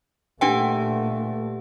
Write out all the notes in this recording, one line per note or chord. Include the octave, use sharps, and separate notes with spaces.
A#2 A3 D4 G4 B4 F#5 G5